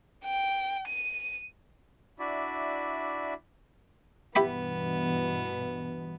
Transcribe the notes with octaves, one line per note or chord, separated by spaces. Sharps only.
G5
D#7
D4 E4 F#4 D5 E5
G2 B2 E3 B3 E4 G4 B5